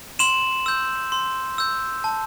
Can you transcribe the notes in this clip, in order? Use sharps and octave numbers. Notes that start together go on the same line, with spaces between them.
C6 E7 F#7
E6 G6
C6
E6 G6
A5